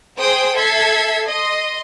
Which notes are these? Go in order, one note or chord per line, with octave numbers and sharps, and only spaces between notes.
G#4 C5 G5 D#6
A4 E5 G#6 C7
D#5 C6